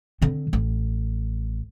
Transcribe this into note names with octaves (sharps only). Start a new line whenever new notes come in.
D3 C4
A1